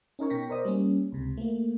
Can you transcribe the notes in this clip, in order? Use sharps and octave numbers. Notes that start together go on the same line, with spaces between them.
C#4 D#4 A#4 C#5
B2 G5 C#6 A#6 B6
A#4 C5 D5 D#5 D#6
G3 A#3 C#4
C#2 C3
A3 A#3